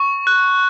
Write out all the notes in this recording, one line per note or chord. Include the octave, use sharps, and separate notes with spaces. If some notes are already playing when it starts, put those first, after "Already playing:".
Already playing: C#6
F#6